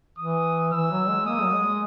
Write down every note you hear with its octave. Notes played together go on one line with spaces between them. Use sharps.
E3 D#6
E3 E6
F#3
G#3
A#3 D#6
F#3
G#3